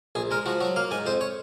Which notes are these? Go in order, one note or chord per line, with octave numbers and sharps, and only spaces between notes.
A#1 G#4
G#3 A#4
F3 F#4
F#3 F#4
A#3 F5
G#2 G#5
F2 C5
C#5